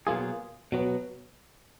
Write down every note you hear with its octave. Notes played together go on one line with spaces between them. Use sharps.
B2 F#3 A#3 F4 G#4
B2 F#3 B3